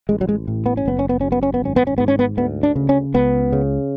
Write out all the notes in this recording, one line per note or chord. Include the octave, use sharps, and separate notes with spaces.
A1 G#3
F#3
G#3
A2
B3
C#4
F#1 B3
C#4
B3
F#2 C#4
B3
C#4
B3
G#1 C#4
B3
C#4
G#2 B3
C#4
B3
D2 B3
D4
C#3
C#4
C#2 B3
C#3